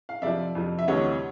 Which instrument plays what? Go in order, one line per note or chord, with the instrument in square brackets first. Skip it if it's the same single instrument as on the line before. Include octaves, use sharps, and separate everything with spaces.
[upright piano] F5
F2 C3 F3 D5 E5
F2 C3 F3
E5
D2 C3 E3 G3 C#5 D#5